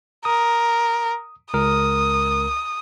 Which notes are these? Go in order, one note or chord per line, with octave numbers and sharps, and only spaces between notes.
A#4 D#6
C#2 A#4 D#6